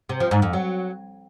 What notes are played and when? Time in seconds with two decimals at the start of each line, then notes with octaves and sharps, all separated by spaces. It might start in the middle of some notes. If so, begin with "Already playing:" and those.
0.09 C3
0.20 F3
0.31 G#2
0.42 F2
0.53 F#3